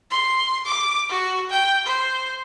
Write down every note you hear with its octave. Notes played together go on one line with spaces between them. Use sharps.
C6
D6
F#4
G5
C5